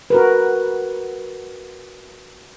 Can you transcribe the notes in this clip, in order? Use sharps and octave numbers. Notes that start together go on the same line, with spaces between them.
F#4 A#4 B4